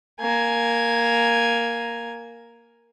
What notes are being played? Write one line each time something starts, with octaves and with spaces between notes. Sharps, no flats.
A#3 G#5